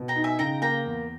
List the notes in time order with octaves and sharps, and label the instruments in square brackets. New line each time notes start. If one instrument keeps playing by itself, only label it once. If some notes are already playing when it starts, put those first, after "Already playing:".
Already playing: [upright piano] B2
[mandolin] G5 A#5
[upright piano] D#4
[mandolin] E5 G#5
[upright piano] C#3 [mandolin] G5 A#5
[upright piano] A#3 [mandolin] G5 A#5
[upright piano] E2